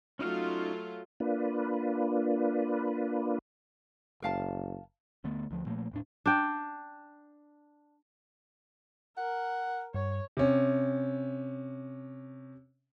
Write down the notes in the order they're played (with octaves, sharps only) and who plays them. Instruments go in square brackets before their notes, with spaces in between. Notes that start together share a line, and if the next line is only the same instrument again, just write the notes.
[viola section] F#3 A3 F4 [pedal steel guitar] C#4 D#4 F5
[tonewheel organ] A#3 D4 F4 B4
[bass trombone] F#1 [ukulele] A#4 F5 A5
[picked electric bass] D2 D3 A3 B3
D2 F3
A#2 F3 A3 A#3
D#1 A2 D4
[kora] D4 G5
[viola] A#4 [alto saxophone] F#5
[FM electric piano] G2 [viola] C#5
[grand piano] C3 C#4